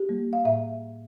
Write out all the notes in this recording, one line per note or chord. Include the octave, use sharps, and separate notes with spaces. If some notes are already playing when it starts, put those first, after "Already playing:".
Already playing: G4
G3 A#3
F5
A2 E5